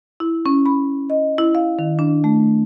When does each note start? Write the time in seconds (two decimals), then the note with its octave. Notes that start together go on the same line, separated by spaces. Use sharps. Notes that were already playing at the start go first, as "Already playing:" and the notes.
0.20 E4
0.46 C#4
0.66 B5
1.10 D#5
1.38 E4
1.55 F5
1.79 D#3
1.99 D4
2.24 A3